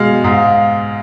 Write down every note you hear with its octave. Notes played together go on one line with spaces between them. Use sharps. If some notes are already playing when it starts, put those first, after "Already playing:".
Already playing: B2 G#3 F5
G#2